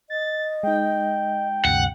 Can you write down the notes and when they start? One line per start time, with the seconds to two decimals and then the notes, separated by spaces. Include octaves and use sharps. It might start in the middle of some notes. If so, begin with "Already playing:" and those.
0.10 D#5 A6
0.63 G#3 D#4 G5
1.65 D2 G2 C3 F#5